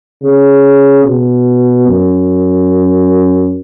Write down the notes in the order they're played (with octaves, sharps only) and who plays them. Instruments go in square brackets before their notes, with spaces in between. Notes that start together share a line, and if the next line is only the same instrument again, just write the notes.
[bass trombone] C#3
B2
F#2